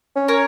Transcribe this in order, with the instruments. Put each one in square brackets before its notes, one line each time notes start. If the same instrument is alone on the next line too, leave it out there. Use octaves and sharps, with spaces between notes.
[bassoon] C#4
[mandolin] A#4 C#5